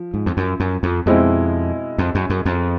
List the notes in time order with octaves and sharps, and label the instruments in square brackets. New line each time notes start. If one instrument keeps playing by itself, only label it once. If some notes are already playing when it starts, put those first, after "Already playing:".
Already playing: [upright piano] F3
[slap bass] G#2
F2
F#2
F#2
F2
[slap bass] F2 [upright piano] B2 G#3 C4 E4
[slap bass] F2
F#2
F#2
F2